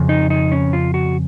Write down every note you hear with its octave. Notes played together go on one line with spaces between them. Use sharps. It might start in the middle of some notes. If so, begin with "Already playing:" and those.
Already playing: F2 C#3
D#4
D#4
C#4
F4
F#4